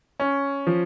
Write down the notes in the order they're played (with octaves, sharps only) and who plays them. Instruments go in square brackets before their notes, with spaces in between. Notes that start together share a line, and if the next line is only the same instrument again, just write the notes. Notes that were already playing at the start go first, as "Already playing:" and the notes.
[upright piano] C#4
F3